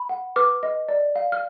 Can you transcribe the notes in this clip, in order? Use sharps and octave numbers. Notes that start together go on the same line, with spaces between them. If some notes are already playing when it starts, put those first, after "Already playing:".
Already playing: B5
F#5
B4 D6 F6
D#5
D5
F5
F6